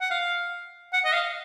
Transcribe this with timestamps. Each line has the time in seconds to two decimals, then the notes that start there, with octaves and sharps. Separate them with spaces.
0.01 F#5
0.11 F5
0.93 F#5
1.05 D#5
1.13 F5